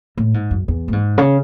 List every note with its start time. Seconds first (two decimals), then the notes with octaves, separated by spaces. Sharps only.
0.18 A2
0.34 G#2
0.51 F#2
0.68 E2
0.88 A2
0.93 G#2
1.18 C#3